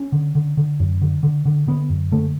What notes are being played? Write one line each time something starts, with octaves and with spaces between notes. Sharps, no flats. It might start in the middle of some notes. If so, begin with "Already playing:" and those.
Already playing: C#4
D3
D3
D3
F#2
D3
D3
D3
D3 B3
F#2
D3 A3